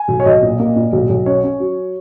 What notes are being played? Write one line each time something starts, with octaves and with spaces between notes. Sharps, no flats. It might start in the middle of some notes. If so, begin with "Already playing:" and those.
Already playing: G#5
B1
C#5
B1 D#5
A#2
A#3
A#2
B1
B1
C#4 C#5
C#4
F#3